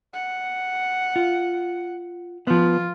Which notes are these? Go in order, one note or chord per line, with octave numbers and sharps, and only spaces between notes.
F#5
F4
F3 B3 F4